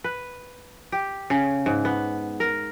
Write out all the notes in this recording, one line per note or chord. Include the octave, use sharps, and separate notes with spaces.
B4
G4
C#3
G#2
B3
A#4